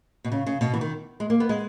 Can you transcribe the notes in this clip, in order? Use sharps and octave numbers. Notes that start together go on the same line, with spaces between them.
B2
C#3
C#3
B2
E3
D#3
G#3
A#3
B3
G#3